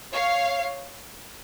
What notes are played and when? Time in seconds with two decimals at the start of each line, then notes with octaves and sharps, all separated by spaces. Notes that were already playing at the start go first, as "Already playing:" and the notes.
0.12 C#5 F5